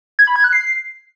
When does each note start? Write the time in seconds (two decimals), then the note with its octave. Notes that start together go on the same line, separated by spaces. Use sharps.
0.19 G#6
0.27 B5
0.36 G#6
0.44 F#6
0.53 C7